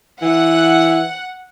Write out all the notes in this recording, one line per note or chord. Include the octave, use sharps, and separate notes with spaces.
E3 F#5